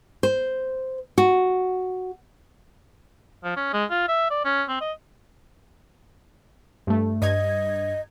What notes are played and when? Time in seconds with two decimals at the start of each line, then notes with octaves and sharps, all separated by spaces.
0.23 C5
1.18 F#4
3.44 F3
3.57 C#4
3.74 G#3
3.91 F4
4.09 E5
4.31 D5
4.45 C#4
4.69 C4
4.81 D#5
6.87 G2 A3
7.22 G2 D#5 G#6